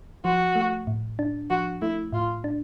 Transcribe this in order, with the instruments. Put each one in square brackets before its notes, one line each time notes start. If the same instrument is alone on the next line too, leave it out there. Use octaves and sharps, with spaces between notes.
[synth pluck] F3 [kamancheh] F#4
[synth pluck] A3
A2
D4
[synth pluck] F3 [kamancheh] F#4
[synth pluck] A3 [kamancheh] E4
[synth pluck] A2 [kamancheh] F4
[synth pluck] D4